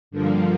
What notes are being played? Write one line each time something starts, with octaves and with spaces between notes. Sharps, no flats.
G2 D3 F3 A#3